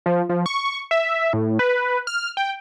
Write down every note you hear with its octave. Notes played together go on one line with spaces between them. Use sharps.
F3
F3
C#6
E5
A2
B4
F6
G5